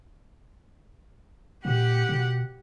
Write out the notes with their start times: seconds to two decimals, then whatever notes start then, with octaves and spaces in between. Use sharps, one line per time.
1.65 A#2 G4 F#5
2.09 B2